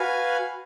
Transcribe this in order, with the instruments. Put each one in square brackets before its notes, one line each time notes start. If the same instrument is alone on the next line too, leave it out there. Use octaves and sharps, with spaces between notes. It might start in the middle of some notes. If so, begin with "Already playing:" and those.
Already playing: [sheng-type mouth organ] F#4 B4 F5 G#5